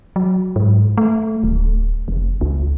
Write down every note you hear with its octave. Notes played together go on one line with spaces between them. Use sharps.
F#3
G#2
A3
D1
F1
C#2